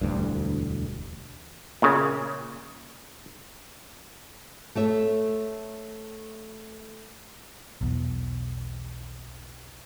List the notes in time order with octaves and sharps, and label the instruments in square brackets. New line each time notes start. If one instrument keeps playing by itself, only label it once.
[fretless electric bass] E1 D2 G2
[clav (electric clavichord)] A#2 C#3
[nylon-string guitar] A3 C#5 E5
[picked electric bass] B1 E2